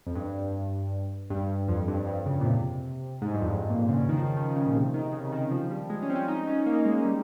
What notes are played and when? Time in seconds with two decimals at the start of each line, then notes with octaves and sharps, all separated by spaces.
0.07 F2
0.15 G2
1.30 G2
1.68 F2
1.88 G2
2.07 G2
2.26 C#3
2.41 A#2
2.45 C3
3.22 G#2
3.34 G2
3.41 F2
3.56 F2
3.60 G2
3.70 A#2
3.89 C#3
4.00 C#3
4.09 D#3
4.17 F3
4.37 D#3
4.56 C#3
4.66 A#2
4.75 C3
4.94 D#3
5.13 C#3
5.32 D#3
5.51 F3
5.70 G3
5.90 G#3
6.03 C#4
6.10 C4
6.15 C#4
6.28 D#4
6.47 C#4
6.66 A#3
6.79 A#3
6.85 G#3
7.05 G3